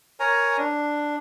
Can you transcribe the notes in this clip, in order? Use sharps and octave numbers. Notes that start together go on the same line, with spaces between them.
A#4 C#5 G#5 A#5
D4